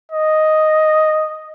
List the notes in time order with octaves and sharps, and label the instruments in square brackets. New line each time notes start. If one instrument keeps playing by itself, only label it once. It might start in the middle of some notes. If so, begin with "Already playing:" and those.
[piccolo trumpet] D#5